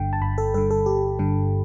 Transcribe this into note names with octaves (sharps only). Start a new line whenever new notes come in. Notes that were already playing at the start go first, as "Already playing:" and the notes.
Already playing: G1 G2 D3 G5
A5
G1 B5
A4
G2 D3 A4
A4
G1 G4
G2 D3